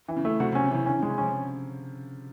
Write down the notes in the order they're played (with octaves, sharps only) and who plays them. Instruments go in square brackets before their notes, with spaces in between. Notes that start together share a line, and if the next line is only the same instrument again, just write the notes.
[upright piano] E3
[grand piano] C#3
[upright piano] A3
[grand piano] C3 [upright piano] F#4
[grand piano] C3
[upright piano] C#4
[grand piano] C#3
[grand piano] C3 [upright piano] E3
[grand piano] D3 [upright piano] C#4
[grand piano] C#3
[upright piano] G#3
[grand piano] C3
[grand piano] F3 [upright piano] C#4